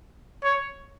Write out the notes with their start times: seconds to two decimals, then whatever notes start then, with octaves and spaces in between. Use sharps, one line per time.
0.44 C#5